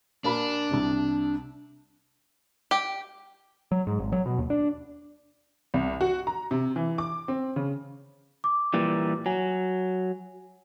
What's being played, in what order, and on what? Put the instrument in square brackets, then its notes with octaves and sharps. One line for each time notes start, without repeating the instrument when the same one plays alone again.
[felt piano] A#2 A#3 B5 [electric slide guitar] D4
[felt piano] C2 C3
[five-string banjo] G4
[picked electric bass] F#3
G#2
G#1
F#3
B2
D#2
D4
[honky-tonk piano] C2
F#4
A#5
C3
E3
D6
C4
C#3
[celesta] D6
[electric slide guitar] A#2 E3 G3
[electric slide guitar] F#3 [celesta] G#5